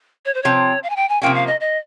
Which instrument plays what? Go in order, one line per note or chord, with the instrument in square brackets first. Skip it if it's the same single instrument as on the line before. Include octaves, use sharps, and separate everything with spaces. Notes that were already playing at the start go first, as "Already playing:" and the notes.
[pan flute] C#5
C5
[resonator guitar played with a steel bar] C3 F3 C4 [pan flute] C#5
[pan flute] F5
G#5
G5
G#5
[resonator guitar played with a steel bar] C3 F3 A#3 C#4 [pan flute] G5
[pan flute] F5
D#5
D#5